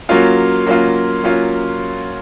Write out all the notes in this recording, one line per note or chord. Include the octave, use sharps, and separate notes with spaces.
F#3 A#3 C#4 F4
F#3 A#3 C#4 F4
F#3 A#3 C#4 F4